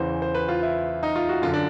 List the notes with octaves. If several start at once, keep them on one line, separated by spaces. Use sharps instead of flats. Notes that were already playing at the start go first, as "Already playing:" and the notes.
Already playing: E2 C#3 E3 C5
C5
B4
F4
E4
D#4
F4
F#4
F#2 D3 F4
D4